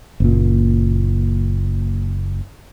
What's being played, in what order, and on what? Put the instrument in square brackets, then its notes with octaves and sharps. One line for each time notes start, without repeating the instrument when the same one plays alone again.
[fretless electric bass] F#1 A#2